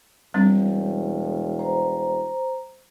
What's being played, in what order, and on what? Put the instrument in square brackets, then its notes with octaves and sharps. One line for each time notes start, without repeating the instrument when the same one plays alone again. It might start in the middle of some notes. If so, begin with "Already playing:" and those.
[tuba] E1 [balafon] G3 C4 D4
[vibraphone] C5 A#5